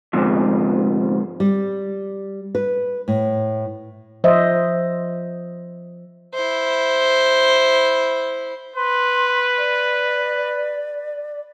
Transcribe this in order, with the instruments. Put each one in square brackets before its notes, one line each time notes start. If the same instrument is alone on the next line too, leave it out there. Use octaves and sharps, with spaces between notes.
[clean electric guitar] D2 G#2 C3 F3
[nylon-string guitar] G3
B4
A2
[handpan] F3 C5 D#5 E5
[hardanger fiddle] E4 C5
[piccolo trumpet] B4 [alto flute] C6
[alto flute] D5